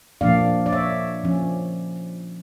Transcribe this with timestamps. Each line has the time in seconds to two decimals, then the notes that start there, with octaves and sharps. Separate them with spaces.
0.21 A#2 F3 A#3 D4 D5 F5
0.66 D5
0.72 C#5 E5
1.24 F3 C#4